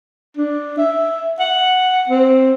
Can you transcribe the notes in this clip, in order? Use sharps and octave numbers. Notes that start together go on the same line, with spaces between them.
D4
E5
F#5
C4